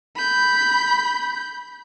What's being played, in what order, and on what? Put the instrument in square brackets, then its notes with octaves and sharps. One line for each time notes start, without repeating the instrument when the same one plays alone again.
[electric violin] B5 G6